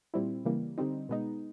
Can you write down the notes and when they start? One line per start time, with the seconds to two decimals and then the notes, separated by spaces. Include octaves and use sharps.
0.14 A#2 G3 C4 E4
0.45 C#3 E3 G3 A#3
0.78 D3 G3 C4 D#4
1.09 B2 G#3 B3 D#4